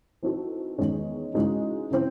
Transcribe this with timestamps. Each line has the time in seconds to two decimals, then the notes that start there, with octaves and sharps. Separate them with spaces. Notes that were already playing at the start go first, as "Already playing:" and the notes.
0.23 E3 C4 D#4 F#4 A4
0.78 E2 D#3 G#3 C#4
1.34 C#3 E3 G#3 D#4 F#4
1.91 C#3 E3 C4